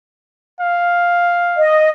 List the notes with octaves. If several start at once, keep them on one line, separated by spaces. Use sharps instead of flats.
F5
D#5